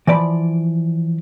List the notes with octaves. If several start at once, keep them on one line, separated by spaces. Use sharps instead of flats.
E3 F3 D5 A5 B5